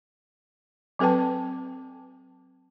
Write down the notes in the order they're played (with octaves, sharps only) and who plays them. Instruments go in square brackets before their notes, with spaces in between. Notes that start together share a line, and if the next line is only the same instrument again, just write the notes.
[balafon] F#3 C4 A4 B4 G5 A5